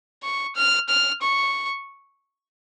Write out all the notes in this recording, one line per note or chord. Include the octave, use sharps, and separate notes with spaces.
C#6
F6
F6
C#6